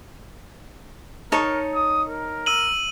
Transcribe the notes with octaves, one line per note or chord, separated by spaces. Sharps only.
D#4 A#4 C#5 A5
D#6
A#4
E6 D#7 F#7